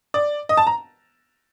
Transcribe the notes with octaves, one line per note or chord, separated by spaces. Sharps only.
D5
D#5
A5
A#5